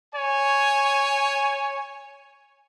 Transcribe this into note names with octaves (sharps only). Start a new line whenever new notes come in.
C#5 G#5